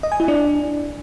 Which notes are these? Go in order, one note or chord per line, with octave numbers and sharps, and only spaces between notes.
D#5
G#5
E4
D4